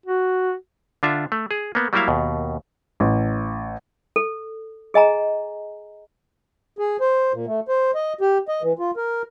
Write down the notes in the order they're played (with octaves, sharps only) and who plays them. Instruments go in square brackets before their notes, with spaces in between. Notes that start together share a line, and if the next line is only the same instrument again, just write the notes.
[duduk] F#4
[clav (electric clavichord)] D3 D4 F4 E5
A3
G#4
A#3 B3
F#3 G3 A#3 E4 E5 F5
D#2 B2
[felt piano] A1
[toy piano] A4
G#4 D#5 G#5 A#5
[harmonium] G#4
C5
A#2
A3
C5
D#5
G4
D#5
E3
F4
A#4